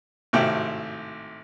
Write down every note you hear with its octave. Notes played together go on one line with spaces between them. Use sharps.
G#1 A2 C3 F#4 G5